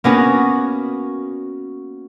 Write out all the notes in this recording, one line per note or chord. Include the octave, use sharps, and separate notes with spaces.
A#3 B3 C#4 F#4